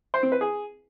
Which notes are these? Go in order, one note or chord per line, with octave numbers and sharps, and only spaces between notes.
C5
C4
B4
G#4